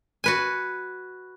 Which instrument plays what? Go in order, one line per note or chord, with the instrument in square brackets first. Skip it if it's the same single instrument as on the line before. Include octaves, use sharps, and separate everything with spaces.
[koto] F#4 B4 G#5